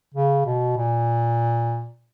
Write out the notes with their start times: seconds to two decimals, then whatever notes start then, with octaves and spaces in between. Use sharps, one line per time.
0.15 C#3
0.46 B2
0.77 A#2